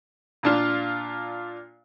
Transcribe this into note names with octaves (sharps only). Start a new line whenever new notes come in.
A#2 D4 F4